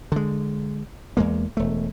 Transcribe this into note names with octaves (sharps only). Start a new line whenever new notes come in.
D3 G#3
E2 G#3 A#3
E1 A3